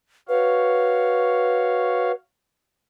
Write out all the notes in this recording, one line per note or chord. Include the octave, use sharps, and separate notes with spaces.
F#4 B4 C#5 F5